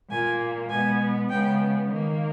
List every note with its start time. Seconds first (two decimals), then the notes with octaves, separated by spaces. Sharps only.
0.10 A#2 A#3 G#5
0.70 B2 G#3 B3 G#5
1.30 C#3 G#3 B3 G5
1.90 D#3 A#3